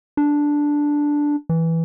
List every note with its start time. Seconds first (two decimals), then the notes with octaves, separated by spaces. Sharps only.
0.17 D4
1.49 E3